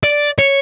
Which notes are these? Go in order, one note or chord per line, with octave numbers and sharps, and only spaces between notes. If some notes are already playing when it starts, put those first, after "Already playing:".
D5
C#5